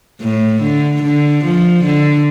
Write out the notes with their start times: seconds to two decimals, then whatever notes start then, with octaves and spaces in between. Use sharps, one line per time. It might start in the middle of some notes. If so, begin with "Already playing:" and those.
0.21 A2
0.62 D3
1.03 D3
1.44 F3
1.84 D3